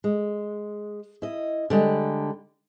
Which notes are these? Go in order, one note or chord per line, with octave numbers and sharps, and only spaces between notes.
G#3
E4 D#5
D3 G3 G#3